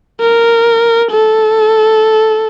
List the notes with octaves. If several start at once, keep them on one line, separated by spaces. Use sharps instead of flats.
A#4
A4